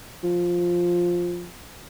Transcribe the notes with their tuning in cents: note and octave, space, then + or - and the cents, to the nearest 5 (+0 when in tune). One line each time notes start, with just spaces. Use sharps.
F3 +5